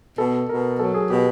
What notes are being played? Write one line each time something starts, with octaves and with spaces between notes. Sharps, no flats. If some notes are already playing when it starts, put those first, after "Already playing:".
B2 A4
B2 A#4
F#3 A4
G#4
B2 G4